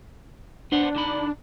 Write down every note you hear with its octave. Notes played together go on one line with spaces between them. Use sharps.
B3 D4 C5 F#5
D3 D#4 B5